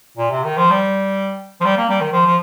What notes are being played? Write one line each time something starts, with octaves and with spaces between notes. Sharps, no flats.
A#2
C3
D#3
F3
G3
F3
G3
A#3
G3
D#3
F3
F3